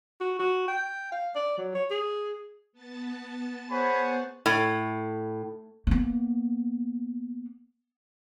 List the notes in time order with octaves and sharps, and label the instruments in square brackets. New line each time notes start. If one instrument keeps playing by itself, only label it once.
[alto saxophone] F#4
F#4
G5
F5
D5
F#3
C#5
G#4
[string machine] B3 A5 A6
[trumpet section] G#4 C#5 F#5 [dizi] C5 [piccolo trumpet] B5
[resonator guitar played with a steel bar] A2
[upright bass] A#3 B3